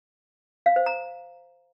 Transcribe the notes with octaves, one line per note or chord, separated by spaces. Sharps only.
F5
C5
A#5